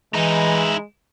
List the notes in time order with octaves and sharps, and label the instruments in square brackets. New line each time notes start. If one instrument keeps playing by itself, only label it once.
[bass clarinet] E3 [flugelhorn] G#3 [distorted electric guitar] D#4 E4